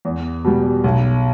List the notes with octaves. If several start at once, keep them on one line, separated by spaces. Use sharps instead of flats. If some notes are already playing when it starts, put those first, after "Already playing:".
E2
B2 G3
B1